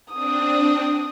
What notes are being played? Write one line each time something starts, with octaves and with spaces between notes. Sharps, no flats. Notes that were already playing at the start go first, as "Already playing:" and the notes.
C4 D4 D#6